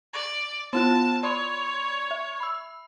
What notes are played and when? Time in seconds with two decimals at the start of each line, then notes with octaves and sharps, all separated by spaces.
0.13 D5
0.73 B3 E4 F4 A5
1.23 C#5 D5 B5 C6
2.11 E5
2.40 B5 E6